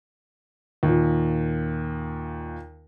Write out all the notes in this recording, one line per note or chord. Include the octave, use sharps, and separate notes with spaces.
D#2 A#2